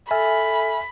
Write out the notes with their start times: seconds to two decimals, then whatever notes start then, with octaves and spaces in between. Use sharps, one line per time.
0.11 A4 E5 G#5 B5 F6